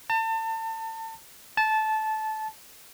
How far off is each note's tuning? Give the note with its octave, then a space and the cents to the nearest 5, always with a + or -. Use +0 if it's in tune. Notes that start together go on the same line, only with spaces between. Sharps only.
A5 +35
A5 -15